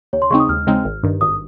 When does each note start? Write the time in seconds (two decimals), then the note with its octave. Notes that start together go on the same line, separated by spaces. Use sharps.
0.13 D#2 C#5
0.22 C6
0.31 C#3 G#3 C4 D#4 C#6
0.40 D#6
0.49 D#2 F6
0.67 C#3 G#3 C4 D#4
0.85 G#1
1.03 G2 D#3
1.21 G#1 D#6